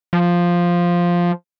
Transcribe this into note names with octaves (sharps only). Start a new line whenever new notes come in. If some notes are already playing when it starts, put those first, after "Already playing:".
F3